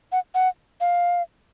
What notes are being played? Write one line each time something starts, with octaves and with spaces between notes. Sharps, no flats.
F#5
F#5
F5